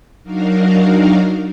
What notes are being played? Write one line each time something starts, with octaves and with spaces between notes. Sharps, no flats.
F#3 D4 D#4 F#4 A#4 F5